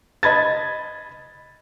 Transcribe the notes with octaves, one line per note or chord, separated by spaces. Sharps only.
D#5 B5 G#6 A6